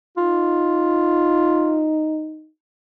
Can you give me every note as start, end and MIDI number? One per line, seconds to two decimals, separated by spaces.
0.17 2.49 63
0.17 1.93 65